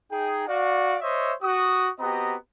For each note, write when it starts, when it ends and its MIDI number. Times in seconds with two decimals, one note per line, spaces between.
0.11 0.44 63
0.11 0.44 68
0.11 0.44 79
0.47 0.97 66
0.47 0.97 74
0.47 0.97 77
1.01 1.32 72
1.01 1.32 73
1.01 1.32 75
1.01 1.32 76
1.41 1.89 66
1.41 1.89 87
1.99 2.35 59
1.99 2.35 60
1.99 2.35 66
1.99 2.35 67
1.99 2.35 75
1.99 2.35 82